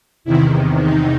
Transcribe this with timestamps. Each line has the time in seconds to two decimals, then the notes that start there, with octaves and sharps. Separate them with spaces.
0.24 E2 C3 D#3 E4
0.79 D#4